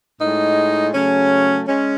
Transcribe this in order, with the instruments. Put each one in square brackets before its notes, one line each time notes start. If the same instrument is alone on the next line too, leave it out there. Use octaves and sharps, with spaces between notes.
[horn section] A2 G#3 D#4
C#3 F#3 A3 C#4
G#3 C#4